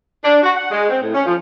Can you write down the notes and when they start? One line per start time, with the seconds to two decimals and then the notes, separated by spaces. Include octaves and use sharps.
0.25 D4
0.43 F#4
0.56 F#5
0.71 G#3
0.90 C4
1.01 A2
1.15 C#4
1.26 F3